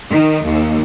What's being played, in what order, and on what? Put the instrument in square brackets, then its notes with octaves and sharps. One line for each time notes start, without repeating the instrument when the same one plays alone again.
[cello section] D#3
D#2